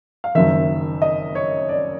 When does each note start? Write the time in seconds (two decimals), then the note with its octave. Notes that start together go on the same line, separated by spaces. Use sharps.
0.24 F5
0.35 F#1 F#2 D#3 E5
1.02 D#5
1.35 C#5
1.69 D5